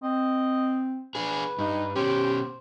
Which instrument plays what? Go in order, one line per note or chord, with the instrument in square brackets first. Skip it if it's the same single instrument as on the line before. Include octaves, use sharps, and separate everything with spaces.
[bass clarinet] C4 [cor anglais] D#5
[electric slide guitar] D4 G#4 [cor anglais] B4
[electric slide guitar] G2 [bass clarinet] D#4
[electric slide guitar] B2 C#4 [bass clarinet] G4 [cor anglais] C5